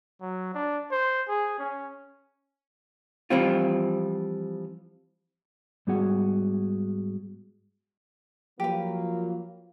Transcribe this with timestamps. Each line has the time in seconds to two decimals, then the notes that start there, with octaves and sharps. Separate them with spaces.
0.21 F#3
0.55 D4
0.92 C5
1.29 G#4
1.59 C#4
3.30 E3 F3 G3 C4 F4
5.87 G#2 G3 B3 F#4 G#4 F#5
8.60 F3 F#3 A#3 G4 B4